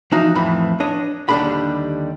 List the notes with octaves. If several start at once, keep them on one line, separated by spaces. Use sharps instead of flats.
E3 F3 D#4 F#4
F2 A2 E3 B5
D4 C#5 D#5
D#2 D3 G3 D4 G#4 B5